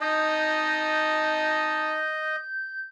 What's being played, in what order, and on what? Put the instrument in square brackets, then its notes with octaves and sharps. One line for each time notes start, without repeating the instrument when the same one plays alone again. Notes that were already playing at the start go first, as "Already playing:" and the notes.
[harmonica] D#4 A5 [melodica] D#5 [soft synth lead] G6